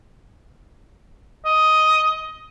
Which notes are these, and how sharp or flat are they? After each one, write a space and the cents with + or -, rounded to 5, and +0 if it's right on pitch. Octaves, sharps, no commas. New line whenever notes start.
D#5 +10